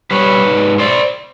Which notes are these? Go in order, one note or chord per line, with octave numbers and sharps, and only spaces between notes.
G3 B4 C#5
G#2
C5 D5